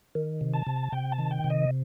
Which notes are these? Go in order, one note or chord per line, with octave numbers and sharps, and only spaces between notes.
D#3
C3
A5
C3
C3 G5
A5
D#3
G5
C3
D#5